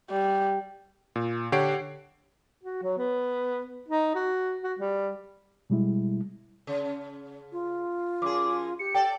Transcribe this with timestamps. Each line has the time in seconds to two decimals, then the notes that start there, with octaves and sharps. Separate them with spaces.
0.10 G3
1.16 A#2
1.52 D3 G4 C#5 F#5 C7 D7
2.63 F#4
2.83 F#3
2.98 B3
3.88 D#4
4.15 F#4
4.63 F#4
4.79 G3
5.70 B2 G3 G#3 E4
6.67 C#3
7.52 F4
8.22 F#2 G#4 D6
8.79 G4 C#7
8.95 A4 D5 G5